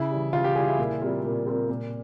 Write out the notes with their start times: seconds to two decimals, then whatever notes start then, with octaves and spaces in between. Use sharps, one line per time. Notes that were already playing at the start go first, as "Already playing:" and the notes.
Already playing: C#3 E4
0.11 E3 G3
0.33 C#3 F4
0.44 G4
0.55 E3 G3 G#4
0.67 E4
0.79 A#2
1.01 G3 C4 F4 A#4
1.24 A#2
1.46 G3 C4 F4 A#4
1.69 A#2